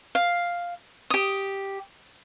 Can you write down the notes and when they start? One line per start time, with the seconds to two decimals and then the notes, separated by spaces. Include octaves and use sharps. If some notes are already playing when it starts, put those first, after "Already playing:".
0.15 F5
1.10 G4 D#6